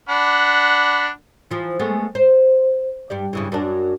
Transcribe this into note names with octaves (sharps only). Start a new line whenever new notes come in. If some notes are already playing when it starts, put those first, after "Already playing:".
D4 F#5 B5
E3 F3
G#3 A3 B3
C5
G2 G4 D5
G2 C#3 E3
F#2 F#3 D4